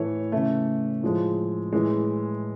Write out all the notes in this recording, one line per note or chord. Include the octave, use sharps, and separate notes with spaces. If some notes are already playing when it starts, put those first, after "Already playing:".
Already playing: A2 E3 A3 C#5
C#3 E3 A3
A2 F3 G#3
A2 E3 G#3